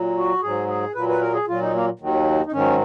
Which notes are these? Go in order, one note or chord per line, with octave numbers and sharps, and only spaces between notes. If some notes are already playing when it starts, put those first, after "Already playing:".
Already playing: A#2 F#3
F#4
G#2 F#3 G#4
G#4
A#2 F#3 B4
B4
A#4
G#4
A#2 F#3 F4
D#4
A#3
D#2 D#3 F#3
D#4
G#2 D#3 F#3 C#4